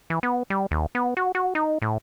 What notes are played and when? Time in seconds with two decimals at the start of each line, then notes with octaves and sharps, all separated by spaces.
0.10 E3
0.23 B3
0.50 G3
0.71 D#2
0.95 B3
1.17 F#4
1.35 F#4
1.55 D#4
1.82 A2